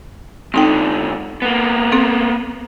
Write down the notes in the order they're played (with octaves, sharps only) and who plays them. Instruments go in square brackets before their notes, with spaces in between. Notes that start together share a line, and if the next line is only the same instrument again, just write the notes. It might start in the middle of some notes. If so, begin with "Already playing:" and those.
[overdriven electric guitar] G#2 D3 [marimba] C4 D#4 G5
[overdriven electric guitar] A#3 B3
[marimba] C4 A4